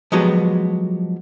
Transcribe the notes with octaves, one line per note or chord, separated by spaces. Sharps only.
F3 F#3 G#3 B3 F#4 G4